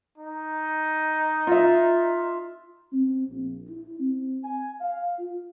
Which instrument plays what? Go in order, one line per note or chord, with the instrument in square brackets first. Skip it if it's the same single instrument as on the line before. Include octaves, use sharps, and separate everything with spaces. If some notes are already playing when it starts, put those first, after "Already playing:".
[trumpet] D#4
[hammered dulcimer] F4 E5
[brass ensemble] C4
A#1
E4
C4
G#5
F5
F4